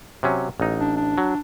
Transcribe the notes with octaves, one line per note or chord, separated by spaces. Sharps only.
C3 F#3 C#4
A1 D#4
D4
D4
F#3